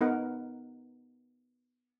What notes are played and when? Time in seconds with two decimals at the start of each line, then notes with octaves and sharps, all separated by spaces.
0.01 B3 D#4 A#4 F#5